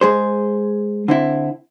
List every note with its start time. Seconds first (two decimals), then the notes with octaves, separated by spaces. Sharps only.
0.01 G#3 G#4 C5
1.08 D3 C4 E4